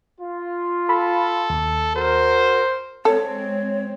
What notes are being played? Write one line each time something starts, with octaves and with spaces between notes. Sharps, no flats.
F4
A4 B5
D#2
F#4 A#4 C5
G#3 C4 A4 C#5